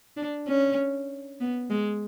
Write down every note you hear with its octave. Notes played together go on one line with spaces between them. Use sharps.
D4
C#4
B3
G#3